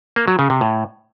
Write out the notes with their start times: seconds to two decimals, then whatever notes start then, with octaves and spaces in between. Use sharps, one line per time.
0.16 A#3
0.28 F#3
0.39 C#3
0.50 C3
0.61 A2